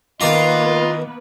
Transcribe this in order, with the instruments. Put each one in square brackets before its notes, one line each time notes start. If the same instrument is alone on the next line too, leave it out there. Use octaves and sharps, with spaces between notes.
[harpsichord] D#3 D5 A#5 [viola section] A#3 B3 B4 [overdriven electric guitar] F4 [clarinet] D#5